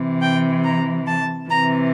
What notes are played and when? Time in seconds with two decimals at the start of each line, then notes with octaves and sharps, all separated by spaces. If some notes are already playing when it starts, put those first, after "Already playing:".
Already playing: C3 E3
0.21 G5
0.63 A#5
1.06 A5
1.49 C3 E3 A#5